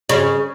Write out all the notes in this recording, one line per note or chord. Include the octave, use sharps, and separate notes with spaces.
C#3